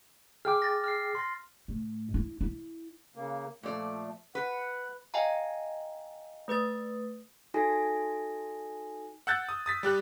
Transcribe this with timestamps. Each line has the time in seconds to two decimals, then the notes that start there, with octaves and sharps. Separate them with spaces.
0.45 G#4 G5 D6 F6
0.62 A6 A#6
0.84 F6 C7
1.15 C6 A#6
1.68 A2
2.14 E4
2.41 E4
3.16 C#3 A#3
3.63 A#2 F3 A3 D5
4.35 B4 F#5
5.14 D#5 F5 G5 G#5 A#5
6.48 A3 B4 D#6 A6
7.54 D#4 F#4 A4 G#5 A#6
9.27 F#5 E6 F#6 G6 A6
9.49 D#6
9.66 D#6 A6 B6
9.83 G3 G4 F#6